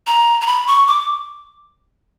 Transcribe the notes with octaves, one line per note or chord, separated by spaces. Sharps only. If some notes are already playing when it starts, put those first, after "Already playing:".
A#5
A#5
B5
C#6
D6